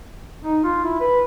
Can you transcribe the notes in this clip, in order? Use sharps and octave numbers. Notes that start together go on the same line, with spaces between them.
D#4
F4
E4
B4